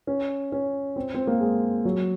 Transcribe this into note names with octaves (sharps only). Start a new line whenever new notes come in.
C#4
C#4
C4
C4
A#3
G#3
F#3